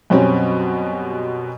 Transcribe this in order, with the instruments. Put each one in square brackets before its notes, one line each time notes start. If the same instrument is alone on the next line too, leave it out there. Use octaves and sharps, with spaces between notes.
[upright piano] F#2 B2 G3 C4 C#4